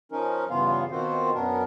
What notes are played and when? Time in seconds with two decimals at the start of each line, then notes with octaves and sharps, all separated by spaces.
0.12 F3 C#4 D#4 A#4
0.50 G2 C#3 E3 B3 F4 F5
0.91 B2 D#3 C4 F4 F#4 C5
1.34 F#2 B3 D4 A#4